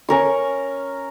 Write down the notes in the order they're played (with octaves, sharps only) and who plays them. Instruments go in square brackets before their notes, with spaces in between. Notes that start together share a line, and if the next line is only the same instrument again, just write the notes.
[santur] C#4 A#4 C#6